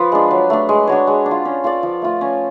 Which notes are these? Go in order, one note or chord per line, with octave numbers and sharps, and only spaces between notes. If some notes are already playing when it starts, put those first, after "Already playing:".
Already playing: F3 F4 B4 D5
G#3 D4
F#3
A3 D4
G#3
D4 F#4 C#5
G#3
D4
F4
C#4
F4 A4 D5
F3
A3 F4
C#4